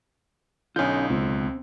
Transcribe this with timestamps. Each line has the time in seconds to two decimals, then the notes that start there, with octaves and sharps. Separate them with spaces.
0.76 B1 D3 C#4 D#4 F4 G6
1.10 C#2 C4